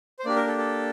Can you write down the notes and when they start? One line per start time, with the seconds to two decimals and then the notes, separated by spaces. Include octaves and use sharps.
0.19 C5
0.25 A#3 D4 G4 D5
0.36 A#4
0.47 A4
0.58 A4